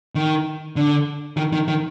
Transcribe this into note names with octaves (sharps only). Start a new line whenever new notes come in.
D#3
D3
D#3
D#3
D#3